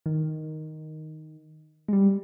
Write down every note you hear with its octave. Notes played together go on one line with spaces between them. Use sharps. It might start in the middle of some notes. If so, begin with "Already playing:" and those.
D#3
G#3
G3